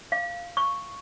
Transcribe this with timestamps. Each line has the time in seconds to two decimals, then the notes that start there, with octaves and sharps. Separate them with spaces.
0.12 F5
0.57 C#6